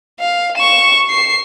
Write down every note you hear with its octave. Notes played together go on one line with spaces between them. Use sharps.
F5
C#6 E7
C7